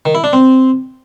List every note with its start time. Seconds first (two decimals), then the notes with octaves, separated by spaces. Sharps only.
0.06 D#3
0.15 E4
0.24 D4
0.33 C4